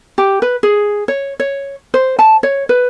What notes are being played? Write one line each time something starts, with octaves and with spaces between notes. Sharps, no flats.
G4
B4
G#4
C#5
C#5
C5
A5
C#5
B4